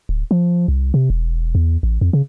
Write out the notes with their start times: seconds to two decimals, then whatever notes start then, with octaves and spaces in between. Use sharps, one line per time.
0.09 D1
0.31 F3
0.68 C2
0.94 C3
1.10 E1
1.55 E2
1.83 A1
2.01 F2
2.13 C#3